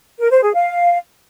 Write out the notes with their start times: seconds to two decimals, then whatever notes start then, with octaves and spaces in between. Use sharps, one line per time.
0.19 A#4
0.30 C5
0.41 G#4
0.53 F5